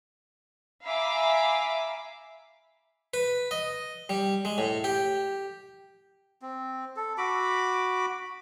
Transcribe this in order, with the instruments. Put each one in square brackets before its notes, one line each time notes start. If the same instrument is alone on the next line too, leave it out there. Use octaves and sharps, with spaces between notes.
[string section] E5 F5 G#5 A#5 B5 D6
[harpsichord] B4
D#5
G3
G#3
A2
G4
[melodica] C4
A4
F#4 B5 D6